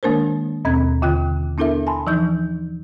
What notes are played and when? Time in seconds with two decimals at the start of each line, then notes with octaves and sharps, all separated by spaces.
0.03 D#3 G#3 A#3 D4 A#4 C5
0.65 D#2 B2 C4 A#5 G#6
1.02 D#2 D3 F4 G5 F#6
1.58 B3 D4 E4 A4 A#4 E5
1.87 G#5 A5 B5 C6
2.07 E3 F3 D#4 G6